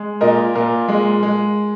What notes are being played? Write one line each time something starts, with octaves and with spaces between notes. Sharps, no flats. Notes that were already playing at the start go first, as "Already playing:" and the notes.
Already playing: G#3
A#2 A#4 D#5
A#2 F4 A#4
G#3
G#3